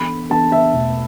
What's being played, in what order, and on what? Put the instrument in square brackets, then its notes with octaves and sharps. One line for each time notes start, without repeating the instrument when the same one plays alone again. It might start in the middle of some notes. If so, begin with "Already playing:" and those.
Already playing: [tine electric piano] E3 B3 D4 A4 [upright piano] B5
[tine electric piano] E3 B3 D4 A4 [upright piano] A5
[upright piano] E5
[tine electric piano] E2 B2 A3